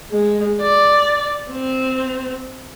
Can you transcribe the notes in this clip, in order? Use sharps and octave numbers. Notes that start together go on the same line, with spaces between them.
G#3
D5
C4